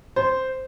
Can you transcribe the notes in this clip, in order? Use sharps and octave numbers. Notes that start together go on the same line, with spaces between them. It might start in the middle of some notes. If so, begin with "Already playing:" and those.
C5